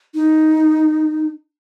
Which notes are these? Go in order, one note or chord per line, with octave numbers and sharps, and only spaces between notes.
D#4